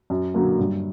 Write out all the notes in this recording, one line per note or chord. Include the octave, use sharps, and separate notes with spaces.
F#2
D3 F#3 A#3
G2